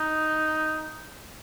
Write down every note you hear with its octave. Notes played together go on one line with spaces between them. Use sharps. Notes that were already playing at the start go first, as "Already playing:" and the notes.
Already playing: D#4